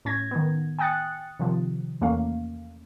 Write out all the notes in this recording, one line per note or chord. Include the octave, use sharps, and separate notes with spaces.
A2 C#4 G#6 A#6
D#3 B3
G5 G#5 D#6 F#6 A6 C#7
C3 D#3 F3
E2 A3 A#3 C#4 F5